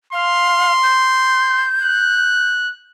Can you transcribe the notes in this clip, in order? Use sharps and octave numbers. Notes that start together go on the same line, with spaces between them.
F5 C6
G6
F#6